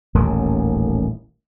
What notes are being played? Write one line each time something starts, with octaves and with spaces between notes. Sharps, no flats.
D#1 A1 D#2 D#3